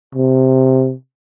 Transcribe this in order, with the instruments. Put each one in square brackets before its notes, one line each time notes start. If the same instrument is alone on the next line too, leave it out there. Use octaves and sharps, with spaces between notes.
[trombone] C3